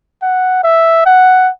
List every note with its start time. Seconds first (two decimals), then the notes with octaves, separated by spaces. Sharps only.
0.22 F#5
0.63 E5
1.06 F#5